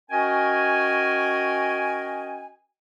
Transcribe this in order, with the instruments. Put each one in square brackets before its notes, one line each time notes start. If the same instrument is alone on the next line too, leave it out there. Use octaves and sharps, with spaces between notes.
[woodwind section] C#4 F#4 A#4 D#5 G5 G#5